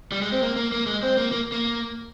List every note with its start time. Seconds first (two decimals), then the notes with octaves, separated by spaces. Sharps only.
0.12 G3
0.21 G#3
0.32 C4
0.42 A#3
0.56 A#3
0.72 A#3
0.86 G#3
1.03 C4
1.17 A#3
1.32 A#3
1.52 A#3